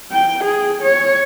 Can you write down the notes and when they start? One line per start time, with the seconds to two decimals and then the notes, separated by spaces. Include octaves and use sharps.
0.12 G5
0.44 G#4
0.82 C#5